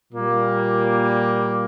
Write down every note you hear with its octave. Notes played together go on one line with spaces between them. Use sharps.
A#2 G3 A#3